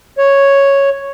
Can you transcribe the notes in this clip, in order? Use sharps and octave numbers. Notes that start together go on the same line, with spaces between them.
C#5